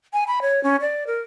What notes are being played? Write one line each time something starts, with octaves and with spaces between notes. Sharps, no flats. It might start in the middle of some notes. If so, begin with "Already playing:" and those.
G#5
B5
C#5
C#4
D5
A#4